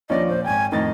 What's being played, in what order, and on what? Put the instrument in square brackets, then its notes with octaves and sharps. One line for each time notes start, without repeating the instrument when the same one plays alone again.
[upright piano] D#2 F3 D4 [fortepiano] C#4 D5 [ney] D#5
[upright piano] A#2 [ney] C5
[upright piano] G#1 G5 [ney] G#5
[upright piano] F2 A2 A6 [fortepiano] D#3 [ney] D#5